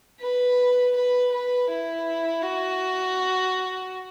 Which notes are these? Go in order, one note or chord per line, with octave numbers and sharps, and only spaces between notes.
B4
B4
B4
E4
F#4